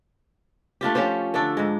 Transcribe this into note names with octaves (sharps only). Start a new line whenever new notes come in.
A3 D4 F4 G4
F3 C#4 G4 C5
D3 A3 D4 A4
G#2 G#3